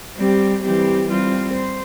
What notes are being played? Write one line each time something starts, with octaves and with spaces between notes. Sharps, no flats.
G3 C4 G4
E3 G3 C4 G4
G3 C4 F4
C5